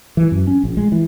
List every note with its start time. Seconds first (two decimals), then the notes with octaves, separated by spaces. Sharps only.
0.17 E3
0.31 F#2
0.47 C#4
0.64 A#1
0.77 G#3
0.92 E3